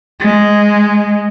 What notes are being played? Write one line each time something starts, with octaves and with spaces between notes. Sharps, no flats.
G#3